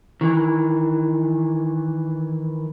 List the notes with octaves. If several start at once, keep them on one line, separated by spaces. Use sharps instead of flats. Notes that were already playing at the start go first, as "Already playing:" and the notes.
D#3 E3